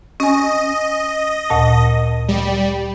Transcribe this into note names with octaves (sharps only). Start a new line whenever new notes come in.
C#4 D#5 G#5
D2 A#2 A5
G3